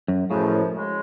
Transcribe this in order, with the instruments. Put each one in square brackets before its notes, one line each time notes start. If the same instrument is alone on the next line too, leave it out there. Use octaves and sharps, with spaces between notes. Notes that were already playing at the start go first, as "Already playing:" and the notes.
[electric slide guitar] F#2
[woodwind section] F#2 C#3 F3 [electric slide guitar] A2
[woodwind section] C#3 G#3